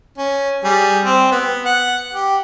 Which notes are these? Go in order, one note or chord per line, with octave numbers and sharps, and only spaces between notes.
C#4
G3 G#4
C4
B3
F#5
G4